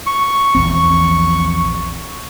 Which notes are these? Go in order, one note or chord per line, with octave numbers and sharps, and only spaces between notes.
C#6
A#1 E2 C4